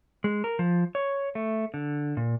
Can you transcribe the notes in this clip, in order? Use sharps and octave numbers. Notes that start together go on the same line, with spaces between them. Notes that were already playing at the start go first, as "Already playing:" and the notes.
G#3
A#4
F3
C#5
A3
D3
A#2